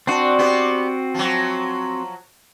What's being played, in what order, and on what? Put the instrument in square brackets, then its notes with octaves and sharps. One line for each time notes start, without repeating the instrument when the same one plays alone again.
[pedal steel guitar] C4 F#4 [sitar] D4
[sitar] B3 G4
F3 F#3